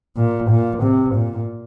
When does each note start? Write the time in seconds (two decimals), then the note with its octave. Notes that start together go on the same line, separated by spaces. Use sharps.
0.17 A#2
0.50 A#2
0.83 C3
1.15 A#2